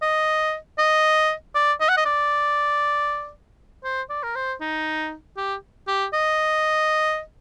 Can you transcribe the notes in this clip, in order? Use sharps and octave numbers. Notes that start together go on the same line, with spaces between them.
D#5
D#5
D5
D#5
F#5
D#5
D5
C5
D5
A#4
C5
D#4
G4
G4
D#5